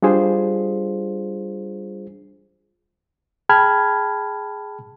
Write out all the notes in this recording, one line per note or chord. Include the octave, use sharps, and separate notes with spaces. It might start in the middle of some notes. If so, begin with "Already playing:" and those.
G3 D4 F4 G#4 C5
G#4 G5 A5 B5 F6 G#6